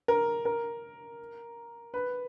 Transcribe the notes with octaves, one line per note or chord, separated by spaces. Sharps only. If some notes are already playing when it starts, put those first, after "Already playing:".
A#4
A#4
B4